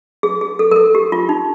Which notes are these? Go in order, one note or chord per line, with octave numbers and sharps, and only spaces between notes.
G#4
G#4
A4
A#4
A4
G4
F4
D#4